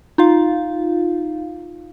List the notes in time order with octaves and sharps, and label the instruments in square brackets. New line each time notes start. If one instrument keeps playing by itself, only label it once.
[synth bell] D#4 F4 F5